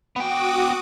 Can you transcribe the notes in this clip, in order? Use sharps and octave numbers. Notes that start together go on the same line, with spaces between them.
B3 F#4 G5 D6 D#6